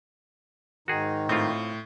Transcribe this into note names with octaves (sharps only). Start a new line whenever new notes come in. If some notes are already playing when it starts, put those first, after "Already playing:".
G#2 D#3 D#4 F#4 G#4
A2 C4 F4